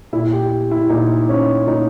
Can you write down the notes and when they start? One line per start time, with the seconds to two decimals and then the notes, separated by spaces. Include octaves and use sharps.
0.13 A#2 E4
0.33 G4
0.71 E4
0.90 A#2 D#4
1.29 C#4
1.67 A#2 D#4